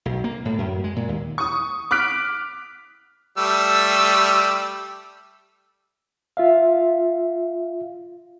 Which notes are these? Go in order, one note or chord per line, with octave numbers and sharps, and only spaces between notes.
B1
A#3
A2
F#2
G#3
A#2
D#2
C#6 D#6
D6 F6 F#6 B6 D7
G3 A3 E6
F4 E5 F5